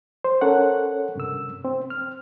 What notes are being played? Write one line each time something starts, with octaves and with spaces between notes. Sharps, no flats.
C5
C#4 A4 A#4 C#5 F#5
G2 C3 E6
C4
F6